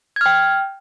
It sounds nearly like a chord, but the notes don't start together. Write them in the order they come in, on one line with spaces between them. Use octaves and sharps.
G#6 F6 G5